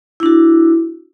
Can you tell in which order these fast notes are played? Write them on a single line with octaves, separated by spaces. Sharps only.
E4 D4 F#4